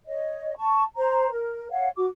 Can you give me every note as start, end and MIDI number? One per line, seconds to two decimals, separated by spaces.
0.08 0.54 73
0.08 0.54 75
0.56 0.83 81
0.56 0.83 85
0.97 1.30 72
0.97 1.30 82
1.31 1.69 70
1.71 1.89 73
1.71 1.89 77
1.71 1.89 78
1.96 2.07 66
1.96 2.07 86